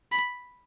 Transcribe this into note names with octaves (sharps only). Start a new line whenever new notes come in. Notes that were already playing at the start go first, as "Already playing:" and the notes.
B5